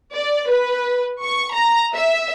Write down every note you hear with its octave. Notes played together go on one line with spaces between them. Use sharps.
D5
B4
C#6
A#5
E5